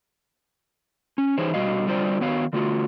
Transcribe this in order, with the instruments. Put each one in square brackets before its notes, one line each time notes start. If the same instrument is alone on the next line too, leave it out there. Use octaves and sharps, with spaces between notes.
[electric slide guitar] C#4
E3 D#4 G#4 C5 C#5
B2 G3 F#4 D#5 F5
D3 G3 F4 C5 D5
D#3 B3 F#4 C#5 F5
D3 A3 F4 F#4